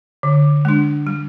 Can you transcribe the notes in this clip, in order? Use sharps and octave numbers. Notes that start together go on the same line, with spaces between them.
D3
G#3 D4
G3